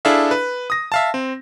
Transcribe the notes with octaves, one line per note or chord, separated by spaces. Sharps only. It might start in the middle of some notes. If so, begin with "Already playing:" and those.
D4 E4 G#4 A4 E5 F5
B4
D#6 A#6
E5 F5 A5
C4